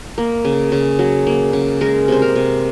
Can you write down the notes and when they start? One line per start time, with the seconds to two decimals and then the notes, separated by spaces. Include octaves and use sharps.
0.18 A#3
0.45 C#3
0.72 C#3
0.99 F#3
1.27 A#3
1.53 C#3
1.81 G#3 A#4
2.08 C3 C5
2.22 A#4
2.36 C3